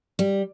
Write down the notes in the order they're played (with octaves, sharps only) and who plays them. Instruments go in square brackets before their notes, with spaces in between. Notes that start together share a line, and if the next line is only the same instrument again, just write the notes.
[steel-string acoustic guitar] G3